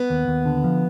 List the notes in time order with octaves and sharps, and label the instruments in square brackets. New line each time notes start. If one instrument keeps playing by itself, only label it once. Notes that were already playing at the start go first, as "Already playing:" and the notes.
Already playing: [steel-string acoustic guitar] B3
[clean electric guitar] D#2
D#2
D3
F3